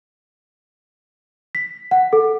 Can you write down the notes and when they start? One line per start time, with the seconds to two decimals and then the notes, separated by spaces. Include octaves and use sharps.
1.55 B6
1.91 F#5
2.13 A4